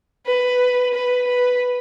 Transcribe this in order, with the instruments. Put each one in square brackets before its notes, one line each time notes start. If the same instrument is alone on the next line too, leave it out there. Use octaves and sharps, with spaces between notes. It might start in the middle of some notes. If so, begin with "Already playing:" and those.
[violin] B4
B4
B4